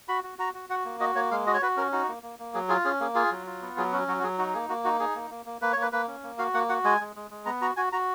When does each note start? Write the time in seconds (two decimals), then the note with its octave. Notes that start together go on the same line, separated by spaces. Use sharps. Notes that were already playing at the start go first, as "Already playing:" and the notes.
0.08 F#4 B5
0.24 F#4
0.39 F#4 A#5
0.54 F#4
0.69 F#4 F#5
0.85 A#3
1.00 F#4 D#5
1.15 A#3 C#5
1.31 G#3 F5
1.47 F#4 D#5
1.54 C#5
1.62 F#4 B4
1.77 C#4 A#4
1.92 D#4 F#4
2.08 A#3
2.23 A#3
2.39 A#3
2.54 F#3 G#4
2.69 F4 G#4
2.85 C#4 G#4
3.00 A#3 G#4
3.15 F4 G#4
3.31 F#3
3.47 F4
3.62 B3
3.77 F#3 G#4
3.92 C#4 F#4
4.08 F#3 F#4
4.19 F#4
4.23 F#3 G#4
4.38 D#4 F#4
4.53 A#3 G#4
4.69 A#3 F#4
4.85 D#4 F#4
5.00 D#4 G#4
5.15 A#3
5.30 A#3
5.46 A#3
5.62 A#3 B4
5.72 A#3 C#5
5.82 B4
5.93 A#3 B4
6.08 C#4
6.23 A#3
6.38 F#4 F5
6.54 A#3 F#5
6.69 F#4 F#5
6.84 G#3 G#5
7.00 G#3
7.16 G#3
7.31 G#3
7.46 B3 A#5
7.61 F#4 A#5
7.76 F#4 G#5
7.92 F#4 A#5